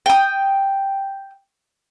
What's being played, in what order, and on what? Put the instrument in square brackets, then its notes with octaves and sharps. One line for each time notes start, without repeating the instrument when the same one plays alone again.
[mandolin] G5 D#6